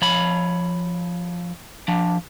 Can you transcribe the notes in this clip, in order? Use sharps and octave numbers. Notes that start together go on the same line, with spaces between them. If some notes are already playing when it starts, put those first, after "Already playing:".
F3 C#5 B5
F3 D4